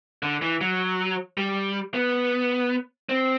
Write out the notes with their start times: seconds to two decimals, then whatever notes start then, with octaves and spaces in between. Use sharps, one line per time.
0.23 D3
0.42 E3
0.61 F#3
1.37 G3
1.94 B3
3.09 C4